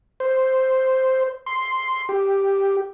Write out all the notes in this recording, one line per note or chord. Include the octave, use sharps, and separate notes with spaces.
C5
C6
G4